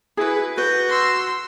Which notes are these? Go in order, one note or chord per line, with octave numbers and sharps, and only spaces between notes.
E4 F#4 G#4 B4
F#4 B4 G6
C6 E6